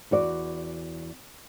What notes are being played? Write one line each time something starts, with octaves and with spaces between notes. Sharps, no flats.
E2 F#4 D5